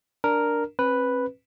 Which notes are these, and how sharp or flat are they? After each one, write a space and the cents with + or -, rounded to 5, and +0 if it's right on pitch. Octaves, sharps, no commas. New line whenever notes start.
D4 +0 A#4 +0
C4 +45 B4 +0